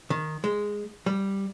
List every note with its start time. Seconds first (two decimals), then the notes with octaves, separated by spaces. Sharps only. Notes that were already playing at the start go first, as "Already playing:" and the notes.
0.10 D#3
0.44 G#3
1.06 G3